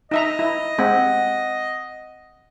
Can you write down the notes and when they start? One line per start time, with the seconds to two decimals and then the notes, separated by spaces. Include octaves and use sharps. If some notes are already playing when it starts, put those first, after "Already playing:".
0.11 D#4 D#5 E5 A#5
0.39 E4
0.78 G#3 C4 F#5